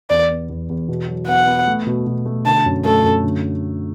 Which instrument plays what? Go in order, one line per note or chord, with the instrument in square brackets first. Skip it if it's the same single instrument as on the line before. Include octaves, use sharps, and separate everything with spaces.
[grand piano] E2 [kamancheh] D5
[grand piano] B3
E2
E2
B2
F#3
[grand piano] B3 [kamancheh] F#5
[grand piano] B3
A3
B2
B2
A3
[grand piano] D3 [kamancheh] A5
[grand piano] F#2
[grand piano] A3 [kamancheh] A4
[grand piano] F#2
D3